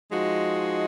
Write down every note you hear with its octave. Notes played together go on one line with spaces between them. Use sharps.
F3 G#3 D#4 F#4